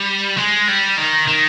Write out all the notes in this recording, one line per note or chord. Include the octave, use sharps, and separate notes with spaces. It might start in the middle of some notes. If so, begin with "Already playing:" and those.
Already playing: G3
G#3
G3
D#3
D#3